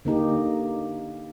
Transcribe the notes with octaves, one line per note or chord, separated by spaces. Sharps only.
D3 A#3 D#4 G4